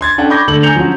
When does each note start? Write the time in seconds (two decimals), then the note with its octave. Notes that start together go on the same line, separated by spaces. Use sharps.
0.01 C6 G#6 A6
0.17 C#4 D4 A4 F#5 G5 A5
0.30 B5 C#6 D6 G6 G#6 A#6
0.48 D3 A3 A4 F#7
0.63 G#5 A#5 G6 C#7 F7
0.75 F3 F#3 C#4 F#4